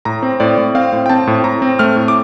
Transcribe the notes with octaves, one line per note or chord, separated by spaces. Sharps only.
A2 A#5
C4
A2 D5
A2
C4 F5
A2
G5
C4 A5
A2
A2 A#5
C4
A3 F6
A2
D6